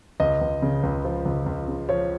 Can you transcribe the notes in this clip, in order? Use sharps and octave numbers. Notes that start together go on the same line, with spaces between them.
C#2 D#5
C#2
C#3
C#2
F3
C#2
C#2
C#3
F3 C#5